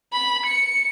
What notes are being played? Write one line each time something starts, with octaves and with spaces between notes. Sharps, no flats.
B5
C#7